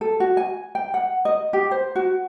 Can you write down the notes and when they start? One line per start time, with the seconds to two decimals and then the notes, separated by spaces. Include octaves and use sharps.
0.01 A4
0.20 F#4
0.37 G#5
0.75 G5
0.94 F#5
1.25 D#5
1.53 G4
1.71 C5
1.96 F#4